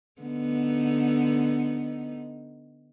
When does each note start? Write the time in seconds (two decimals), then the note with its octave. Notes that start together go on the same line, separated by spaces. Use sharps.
0.22 D3 B3 D#4